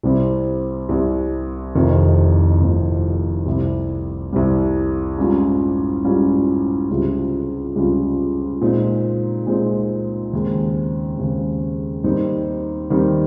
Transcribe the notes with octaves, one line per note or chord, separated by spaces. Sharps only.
C2 C3 G3 C4
C2 C3 G3 C4
F1 F2 C3 D#3
F1 F2 C3 D#3
C2 C3 G3
C2 C3 G3
G#2 G3 C#4 F4
G#2 G3 C#4 F4
C#2 C3 G3 C#4 F4
C#2 C3 G3 C#4 F4
A#2 G#3 C4 D#4
A#2 G#3 C4 D#4
D#2 C#3 G#3 C4
D#2 C#3 G#3 C4
D#2 D#3 G3 C4 D#4
D#2 D#3 G3 C4 D#4